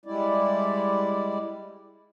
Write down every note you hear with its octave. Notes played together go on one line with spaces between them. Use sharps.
G3 G#3 E4 D5